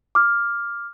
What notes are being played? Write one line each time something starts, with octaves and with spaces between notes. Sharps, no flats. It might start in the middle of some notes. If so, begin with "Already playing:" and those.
D6 F6